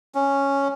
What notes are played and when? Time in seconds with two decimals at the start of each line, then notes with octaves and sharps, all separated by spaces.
0.15 C#4